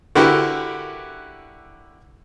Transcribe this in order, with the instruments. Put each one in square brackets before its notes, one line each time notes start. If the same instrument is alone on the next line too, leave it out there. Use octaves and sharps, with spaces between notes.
[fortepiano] D3 E4 F#4 G4 A#4 B4